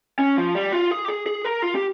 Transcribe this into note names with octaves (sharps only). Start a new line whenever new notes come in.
C#4
F3
G3
F4
G#4
G4
G#4
G#4
A#4
F4
G4